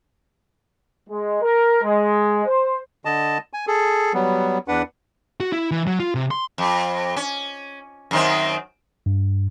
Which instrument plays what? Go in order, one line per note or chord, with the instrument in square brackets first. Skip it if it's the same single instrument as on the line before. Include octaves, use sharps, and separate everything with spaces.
[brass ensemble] G#3
A#4
G#3
C5
[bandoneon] D3 D#5 A5
G#5
G#4 A4
F#3 G3 B3
E2 D4 B4 F#5
[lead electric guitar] F#4
E4
E3
F#3
F4
C3
C6
[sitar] F2
C#4
F#2 D#3 C4
[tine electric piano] G2